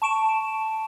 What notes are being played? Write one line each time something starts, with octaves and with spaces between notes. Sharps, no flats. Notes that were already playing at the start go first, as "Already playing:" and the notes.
A5 C#6 D7 E7